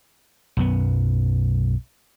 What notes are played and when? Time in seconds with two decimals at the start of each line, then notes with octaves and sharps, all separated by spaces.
0.57 B1 F#2 B3